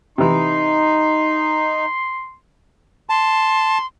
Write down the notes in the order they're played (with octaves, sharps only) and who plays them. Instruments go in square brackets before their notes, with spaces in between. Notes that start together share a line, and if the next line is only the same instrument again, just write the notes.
[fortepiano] C3 E3 [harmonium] D#4 [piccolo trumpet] C6
[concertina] A5 [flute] C6